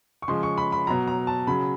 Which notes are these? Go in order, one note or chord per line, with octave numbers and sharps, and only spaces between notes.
C#6
C#3 F3 G#3 C6
C#6
B5
B5
B2 F#3 A#5
A#5
A5
C#3 F#3 B5